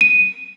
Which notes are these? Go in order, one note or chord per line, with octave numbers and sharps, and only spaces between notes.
D#7